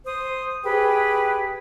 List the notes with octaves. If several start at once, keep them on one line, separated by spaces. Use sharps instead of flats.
C5 D#6
G4 G#4 B4 G5